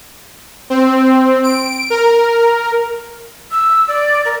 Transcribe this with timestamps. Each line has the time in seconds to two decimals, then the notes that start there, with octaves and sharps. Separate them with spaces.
0.70 C4
1.44 D7
1.90 A#4
3.52 E6
3.88 D5
4.25 A#4